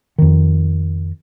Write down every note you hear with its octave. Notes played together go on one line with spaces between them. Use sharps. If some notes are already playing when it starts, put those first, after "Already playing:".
F2 D#3